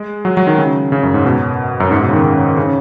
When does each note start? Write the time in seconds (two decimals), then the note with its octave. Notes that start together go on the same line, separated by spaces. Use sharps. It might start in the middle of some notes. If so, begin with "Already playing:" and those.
Already playing: G#3
0.25 F#3
0.37 F#3
0.47 D#3
0.58 C#3
0.92 C#3
1.03 F#2
1.14 G#2
1.25 B2
1.80 F#2
1.91 G#2
2.02 B2
2.09 C#3
2.13 D#3
2.24 C#3
2.57 C#3